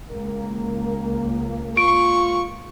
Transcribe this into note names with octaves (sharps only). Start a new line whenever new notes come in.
C#2 A#3 A#4
F4 C#6 D7